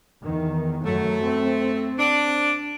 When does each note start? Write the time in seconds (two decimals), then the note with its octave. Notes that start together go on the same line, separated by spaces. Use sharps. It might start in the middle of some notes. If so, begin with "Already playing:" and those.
0.21 E2 D#3
0.85 F#2 F#3 A3
1.23 C4
1.98 D4